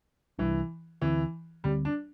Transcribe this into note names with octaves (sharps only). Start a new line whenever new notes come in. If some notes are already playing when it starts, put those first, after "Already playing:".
C2 C3 E3 G3 D4
D2 D3 E3 C4
D2 D3 G3 C4
D4